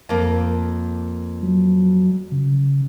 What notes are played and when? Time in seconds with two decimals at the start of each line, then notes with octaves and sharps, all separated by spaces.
0.09 F2 A#3
1.43 F#3
2.32 C#3